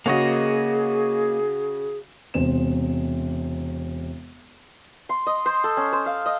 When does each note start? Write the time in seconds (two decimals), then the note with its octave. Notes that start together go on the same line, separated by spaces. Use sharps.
0.06 C#3 A#3 F#4 G#4 D#5
2.34 E1 C3 C5 E7
5.09 C6
5.27 D#5
5.46 C5
5.64 A4
5.77 C#4
5.92 C5
6.06 F5
6.26 D#5